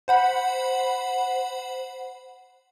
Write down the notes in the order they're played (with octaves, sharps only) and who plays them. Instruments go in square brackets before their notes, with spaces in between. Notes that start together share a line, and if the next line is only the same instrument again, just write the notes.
[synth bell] C5 F#5 B5